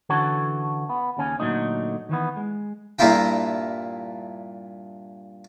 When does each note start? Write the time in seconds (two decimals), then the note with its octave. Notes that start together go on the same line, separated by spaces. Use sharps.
0.09 D3 E3 C#4 F#4 A4 C#5
0.89 B3
1.17 D#2 C#3 C#4 G#5
1.40 A#2 D3 F#3 A3 D#4
2.09 D#3 E3 B3
2.37 G#3
2.99 G2 A#2 A#3 E4 F4 G5